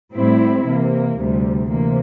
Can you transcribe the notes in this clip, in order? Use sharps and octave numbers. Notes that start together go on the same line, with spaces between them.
A2 G3 C4 E4
C3 E3 A#3
D2 C3 G3
C3 E3 A#3